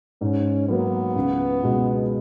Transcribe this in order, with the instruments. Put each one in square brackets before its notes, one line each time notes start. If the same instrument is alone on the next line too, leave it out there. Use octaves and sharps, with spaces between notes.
[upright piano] G#2 [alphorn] C#4
[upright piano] F#3 A#3 [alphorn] B3
[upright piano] C#2
B2 G#3